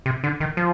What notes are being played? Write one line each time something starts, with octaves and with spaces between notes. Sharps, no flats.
C3
D3
D#3
F3